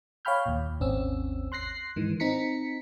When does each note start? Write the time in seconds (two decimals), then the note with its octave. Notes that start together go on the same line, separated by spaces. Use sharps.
0.25 C#5 F5 G5 B5 F6 G6
0.46 D#2 A#2
0.80 G#1 D#2 C4 C#4 E6
1.52 C6 F#6 A#6 C7
1.96 G#2 D#3 E3
2.20 C4 D#4 A#5 B6 C#7